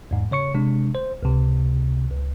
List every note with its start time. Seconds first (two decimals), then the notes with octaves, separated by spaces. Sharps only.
0.11 E2 G#2
0.31 C#3 C#5 C#6 C#7
0.54 C3 G#3 D4
0.95 C5
1.23 C#2 C3
2.11 C#2